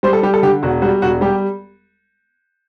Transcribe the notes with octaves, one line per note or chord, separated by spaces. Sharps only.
G3 C5
A4
G3 G4
A4
D3 G4
E1 F#4
G3 F#4
E1 F#4
G3 G4